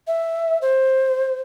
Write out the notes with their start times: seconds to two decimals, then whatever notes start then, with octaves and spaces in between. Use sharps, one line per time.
0.07 E5
0.62 C5